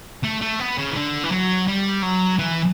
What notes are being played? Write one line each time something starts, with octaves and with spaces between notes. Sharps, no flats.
A3
A3
B3
C#3
E3
D3
E3
F#3
G3
F#3
E3